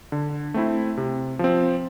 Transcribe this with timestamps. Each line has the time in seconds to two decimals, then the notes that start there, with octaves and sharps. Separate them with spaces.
0.12 D3
0.54 A3 C4 E4
0.97 C3
1.39 F3 C4